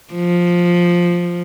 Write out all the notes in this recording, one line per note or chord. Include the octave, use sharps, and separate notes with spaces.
F3